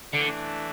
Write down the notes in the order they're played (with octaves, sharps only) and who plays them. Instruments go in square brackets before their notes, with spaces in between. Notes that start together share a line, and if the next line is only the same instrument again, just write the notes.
[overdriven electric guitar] D3 [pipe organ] E3 A3 D4